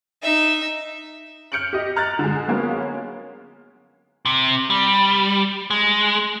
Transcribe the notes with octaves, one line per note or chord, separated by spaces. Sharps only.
D#4 E5
F6 G6 C#7 D7 F#7
G4 D#5
A#5 F6 F#6 A6
D3 G#3
F#3 G#3 A#3 B3 C#4 F4
C3
G3
G#3